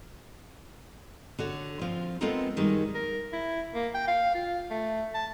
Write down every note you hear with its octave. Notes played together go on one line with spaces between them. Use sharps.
D3 F#4 C#5
F3 C4 F4
G#3 B3 C4 F4 A4 A#4
F#2 D#3 G3 G#3
A#4
E4
A#3
G5
F5
F4
A3
A5